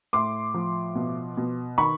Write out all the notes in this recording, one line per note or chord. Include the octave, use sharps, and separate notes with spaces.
A2 C6 D6
F3
B2
B2
D#3 B5 C#6